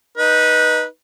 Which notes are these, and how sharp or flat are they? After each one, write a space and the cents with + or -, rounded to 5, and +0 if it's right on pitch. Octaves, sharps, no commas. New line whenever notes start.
D#4 +0 B4 -20